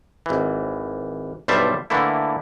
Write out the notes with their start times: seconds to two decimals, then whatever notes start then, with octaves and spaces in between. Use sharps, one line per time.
0.26 G#1 E3
1.48 B1 G2 G3 C5 E5 A5
1.90 D3 E3 A3 A#3 E4